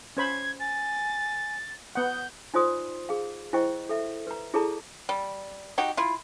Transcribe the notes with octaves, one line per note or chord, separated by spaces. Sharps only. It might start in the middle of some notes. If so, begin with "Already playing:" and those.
C#4 C5 B5 G#6
G#5 A6
B3 F#5 D#6 G6
D#4 F4 C5 D5 C6 D#6
G#4 F5
E4 C5 D#5 G5 C#6
A4 E5
B4 A#5
E4 G#4 A4 D5 A5 A#5
G3
D#4 F#4 G4
E4 F4